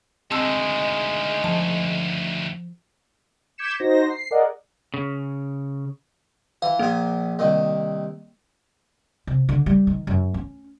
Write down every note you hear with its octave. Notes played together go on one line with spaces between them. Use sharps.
D2 D#3 G#3 C4 A5 E6
F3 A5
D6 G6 G#6 B6 C#7 E7
D#4 F#4 C5 A#6
C7
G#4 A#4 D5 D#5 F#5
C#3
E3 F5
A#1 A#2 A#3 G#5
C2 D#3
C3
D3
G3
D#3
F#2
C#4